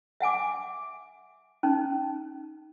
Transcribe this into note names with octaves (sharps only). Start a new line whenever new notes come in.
E5 F#5 G#5 D6
C#4 D#4